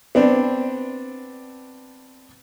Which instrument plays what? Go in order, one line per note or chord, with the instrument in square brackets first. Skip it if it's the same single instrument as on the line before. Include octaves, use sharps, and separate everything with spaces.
[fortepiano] B3 C4 D4